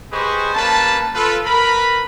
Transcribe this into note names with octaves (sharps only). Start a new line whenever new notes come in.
G4 G#4 B4 C5 D#5 C#6
G3 A#3 C#4 B4 A5
F4 A4 B4
A#4 B4 B5